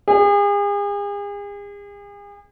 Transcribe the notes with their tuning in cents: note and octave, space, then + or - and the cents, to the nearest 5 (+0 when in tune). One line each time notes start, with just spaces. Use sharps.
G#4 -40